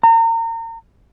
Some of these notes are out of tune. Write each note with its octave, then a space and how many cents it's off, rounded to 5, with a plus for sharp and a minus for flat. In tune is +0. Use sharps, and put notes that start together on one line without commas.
A#5 -35